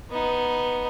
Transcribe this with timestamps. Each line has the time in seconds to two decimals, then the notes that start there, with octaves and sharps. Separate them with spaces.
0.11 B3 D#4